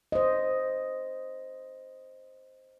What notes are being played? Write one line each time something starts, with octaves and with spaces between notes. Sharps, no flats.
C5 D#5